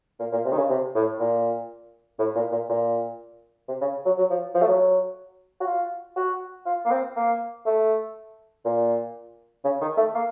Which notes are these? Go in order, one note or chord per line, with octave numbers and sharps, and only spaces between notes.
A#2
A#2
C3
D#3
C#3
C3
A2
A#2
A2
A#2
A#2
A#2
C3
C#3
F#3
F#3
F3
F3
A3
F#3
F#4
F4
F#4
F4
A#3
C4
A#3
A3
A#2
C#3
D#3
A3
A#3